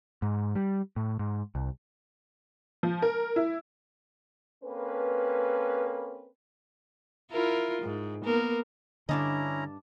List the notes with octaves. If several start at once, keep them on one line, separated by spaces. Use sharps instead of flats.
G#2
G3
A2
G#2
C2
F3
A#4
E4
A#3 C4 C#4 A4 B4
E4 F4 A#4
G#2
A#3 B3 A#4
G2 D3 C#4 D4 E4 D#5 A#5